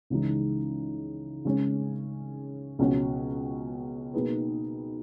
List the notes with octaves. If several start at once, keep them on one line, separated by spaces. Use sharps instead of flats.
C#2 C#3 E3 G#3 D#4
C#3 G#3 C#4
C#2 B2 F#3 C#4 F#4
B2 A#3 D#4 G#4 B4